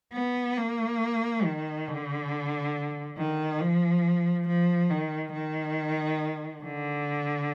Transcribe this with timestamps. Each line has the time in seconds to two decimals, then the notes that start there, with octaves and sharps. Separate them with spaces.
0.14 B3
0.57 A#3
1.44 D#3
1.88 D3
3.17 D#3
3.61 F3
4.48 F3
4.91 D#3
5.33 D#3
6.64 D3